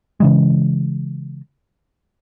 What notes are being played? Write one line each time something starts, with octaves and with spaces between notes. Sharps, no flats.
C#3 E3 G#3